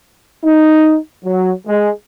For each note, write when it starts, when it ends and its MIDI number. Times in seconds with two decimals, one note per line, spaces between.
0.44 0.96 63
1.25 1.51 54
1.67 1.90 56